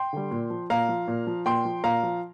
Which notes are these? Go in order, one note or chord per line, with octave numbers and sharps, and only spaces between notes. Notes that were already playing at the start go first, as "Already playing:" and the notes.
Already playing: G5 C6
D3 G3
A#2
F3
A#2 F5 A#5
F3
A#2
F3
A#2 G5 C6
F3
A#2 F5 A#5
F3